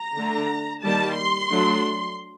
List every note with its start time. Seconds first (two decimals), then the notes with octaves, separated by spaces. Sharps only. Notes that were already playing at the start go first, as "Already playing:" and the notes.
Already playing: A#5
0.16 D3 A3 D4
0.83 D#3 G3 A#3 A5
1.16 C6
1.50 F#3 A3 D4